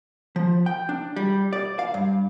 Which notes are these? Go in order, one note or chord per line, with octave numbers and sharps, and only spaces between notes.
F3
G5
D4
G3
D5
F5
G2